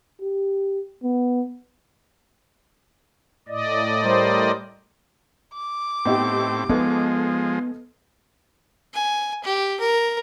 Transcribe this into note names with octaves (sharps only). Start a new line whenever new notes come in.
G4
B3
A2 D5 D#5
G3 A#4 C5
D6
A2 B3 C4 D#4 G4
F3 G#3 B3 D#4 A4 B4
G#5
G4
A#4